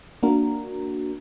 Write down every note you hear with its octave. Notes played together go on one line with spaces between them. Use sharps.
A#3 D4 F#4 A#4